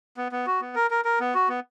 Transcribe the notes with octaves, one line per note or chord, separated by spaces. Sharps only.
B3
B3
F#4
B3
A#4
A#4
A#4
B3
F#4
B3